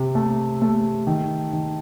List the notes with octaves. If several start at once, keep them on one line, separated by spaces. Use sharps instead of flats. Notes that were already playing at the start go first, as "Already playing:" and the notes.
Already playing: C3
A3
A3
D#3
D#3